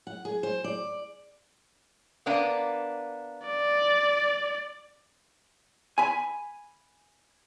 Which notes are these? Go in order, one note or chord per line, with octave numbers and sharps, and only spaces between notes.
F#5
G#4
C5
D5
A#3 B3 D4
D5
G#5 B5